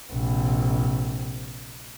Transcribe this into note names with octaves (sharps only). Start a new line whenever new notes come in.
A#1 C3